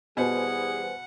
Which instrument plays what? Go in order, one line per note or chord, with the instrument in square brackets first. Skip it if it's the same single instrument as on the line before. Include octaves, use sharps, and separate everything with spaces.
[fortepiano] B2 [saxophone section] E3 G3 G#4 [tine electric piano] B4 C5 G#5 [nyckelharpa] F#5